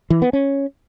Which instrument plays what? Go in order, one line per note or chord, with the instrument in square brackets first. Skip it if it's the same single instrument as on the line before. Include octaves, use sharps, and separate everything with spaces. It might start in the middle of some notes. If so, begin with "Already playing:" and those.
[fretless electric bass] E3
B3
C#4